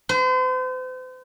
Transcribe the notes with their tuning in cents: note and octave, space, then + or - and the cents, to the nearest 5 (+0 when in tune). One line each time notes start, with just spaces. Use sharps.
C5 -40